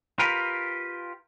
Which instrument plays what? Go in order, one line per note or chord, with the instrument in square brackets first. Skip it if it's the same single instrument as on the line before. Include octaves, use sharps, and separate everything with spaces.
[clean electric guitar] F4 G4 A#4 B4